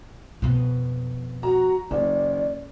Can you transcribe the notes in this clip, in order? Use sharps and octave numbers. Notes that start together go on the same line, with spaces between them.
F2 B2
F#4 A#5
F#1 D#3 D5